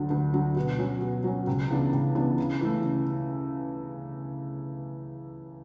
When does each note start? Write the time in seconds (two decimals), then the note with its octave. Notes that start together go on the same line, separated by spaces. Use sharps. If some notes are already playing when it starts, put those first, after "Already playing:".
Already playing: D2 D3 F#3
0.10 D2
0.34 D3 F#3
0.56 B2
0.78 F#3 C#4
1.01 B2
1.24 F#3 C#4
1.47 C#2
1.70 C#3 E3 B3 D4
1.93 C#2
2.15 C#3 E3 B3 D4
2.38 C#3
2.61 E3 A3
2.84 C#3